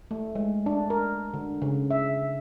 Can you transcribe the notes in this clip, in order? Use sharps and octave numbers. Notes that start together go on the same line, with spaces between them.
A3
G#3
D4
A#4
D3
C#3
E5